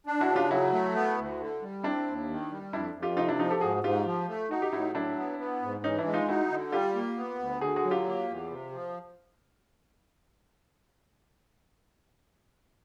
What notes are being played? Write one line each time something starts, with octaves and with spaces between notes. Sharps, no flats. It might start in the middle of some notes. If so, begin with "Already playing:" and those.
D4
E4 F#4
C#3
F4 G4
F#3 E4 F#4
A3
B3
D2
D3
G3
C4 D4 E4
D#2
D#3
G3
F2 D4 E4
F2
F4 G4
C3 D#4 F4
D4 E4
F3 D#4 F4
G4 A4
G#2 F#4 G#4
G#2 F4 G4
F3
A3
D#4 F#4
G4
A2 E4 F#4
F#3 D4 E4
B3
B3
G#2
E3 C#4 D#4
D4 E4
G#3
D#4 F4
D#4 E4 F#4
D3
G3 F4 G4
A#3
B3
D2
D3 F#4 G#4
F#4 G#4
F#3
F4 G4
A#3
E2
C3
F3